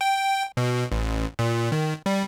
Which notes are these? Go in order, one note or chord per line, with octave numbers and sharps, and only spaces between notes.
G5
B2
A1
A#2
D#3
G3